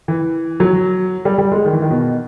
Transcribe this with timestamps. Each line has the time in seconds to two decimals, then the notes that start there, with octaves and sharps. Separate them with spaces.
0.08 E3
0.60 F#3
1.25 G3
1.38 G3
1.52 G#3
1.64 D#3
1.73 E3
1.82 D#3
1.91 B2